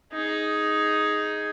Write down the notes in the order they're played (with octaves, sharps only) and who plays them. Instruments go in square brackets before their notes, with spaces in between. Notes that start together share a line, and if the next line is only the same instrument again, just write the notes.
[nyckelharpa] D#4 G#4